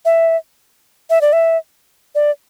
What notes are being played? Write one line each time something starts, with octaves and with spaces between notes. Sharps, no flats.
E5
E5
D5
E5
D5